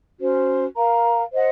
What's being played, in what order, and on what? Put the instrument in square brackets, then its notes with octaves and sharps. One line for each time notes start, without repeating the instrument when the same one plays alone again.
[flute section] C#4 F#4 C5
A#4 F5 A#5
C5 D#5 F#5